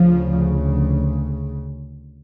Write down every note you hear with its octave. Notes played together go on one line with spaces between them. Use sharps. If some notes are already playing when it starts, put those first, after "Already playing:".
Already playing: D2 C#3 F3